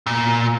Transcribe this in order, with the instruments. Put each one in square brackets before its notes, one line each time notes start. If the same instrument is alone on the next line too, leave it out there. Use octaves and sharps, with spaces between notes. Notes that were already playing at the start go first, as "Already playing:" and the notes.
[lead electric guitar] A#2